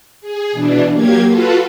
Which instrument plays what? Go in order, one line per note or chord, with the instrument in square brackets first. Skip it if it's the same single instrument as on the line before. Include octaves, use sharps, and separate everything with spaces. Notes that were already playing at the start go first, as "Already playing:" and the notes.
[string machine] G#4
B2 E3 D4
F#3 A#3 G4 G#6
F4 F#4 A4 B4